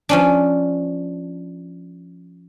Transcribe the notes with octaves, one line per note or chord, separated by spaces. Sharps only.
F3 C#4 D4